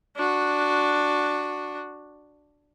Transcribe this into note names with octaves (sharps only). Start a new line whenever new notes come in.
D4 F#4